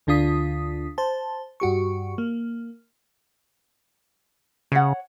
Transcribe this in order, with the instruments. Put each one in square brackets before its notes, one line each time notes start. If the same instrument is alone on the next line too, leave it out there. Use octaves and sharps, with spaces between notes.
[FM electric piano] D2 D3 D4 F4 D#6 B6
C5 A5
G2 F#4 G4 C#6
A#3
[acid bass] C#3 [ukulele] C#5 F#5